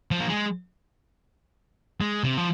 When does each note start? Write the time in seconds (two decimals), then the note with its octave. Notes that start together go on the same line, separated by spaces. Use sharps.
0.11 F3
0.20 A#3
0.29 G#3
2.01 G#3
2.24 C3
2.38 F3